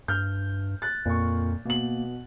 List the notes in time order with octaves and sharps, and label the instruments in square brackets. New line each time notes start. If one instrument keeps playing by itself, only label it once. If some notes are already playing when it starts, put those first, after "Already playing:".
[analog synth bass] G2 [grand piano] F6 G6
[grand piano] F#6 A6
[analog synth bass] F2 [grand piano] A#2 C#6
[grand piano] B2 F#7 [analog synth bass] A#3